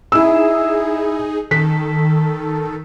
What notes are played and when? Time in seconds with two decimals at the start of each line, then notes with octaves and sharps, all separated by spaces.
0.12 D#4 E4 G#4 E6
1.51 D#3 A4 B6